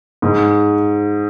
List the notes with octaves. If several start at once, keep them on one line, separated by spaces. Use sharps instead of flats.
G#2